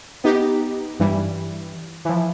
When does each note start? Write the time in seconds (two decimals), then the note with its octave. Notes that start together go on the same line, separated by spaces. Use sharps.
0.24 B3 D#4 G4
0.99 G2 E3 G3
2.05 E3 F3